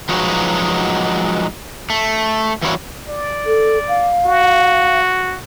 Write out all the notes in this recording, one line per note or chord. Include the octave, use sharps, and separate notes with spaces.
F3 F#3 G#3 D#4 F#4 B4
A3
E3 G3 A#3 E4 F#4 C#5
D5
A4
F5
F#4